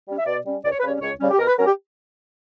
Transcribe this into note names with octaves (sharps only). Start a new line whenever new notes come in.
G3 C#4
E5
B2 D5
G3 C#4
C#2 D5
C#5
B4
C#3 G3 C#4 C#5
C#2 C#5
C#3 G3 C#4
G4
B2 A#4
B4
F#3 C#4 A#4
G4